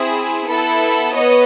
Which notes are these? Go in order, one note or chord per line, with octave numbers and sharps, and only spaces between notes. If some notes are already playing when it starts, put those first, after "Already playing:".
Already playing: C4 E4 G#4
B3 E4 A4
B3 C#5 D#5